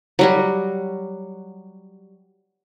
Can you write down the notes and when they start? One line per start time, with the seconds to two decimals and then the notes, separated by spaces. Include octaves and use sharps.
0.19 F#3 G3 F#4